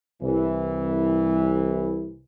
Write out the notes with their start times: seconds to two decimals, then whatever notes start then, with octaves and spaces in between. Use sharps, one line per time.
0.22 C2 E3